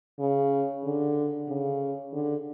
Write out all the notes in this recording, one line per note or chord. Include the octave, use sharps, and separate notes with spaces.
C#3
D3
C#3
D3